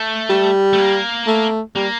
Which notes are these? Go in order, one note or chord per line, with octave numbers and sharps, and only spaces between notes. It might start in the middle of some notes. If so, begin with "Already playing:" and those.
Already playing: A3
G3
A3
A#3
A3
G3 A#3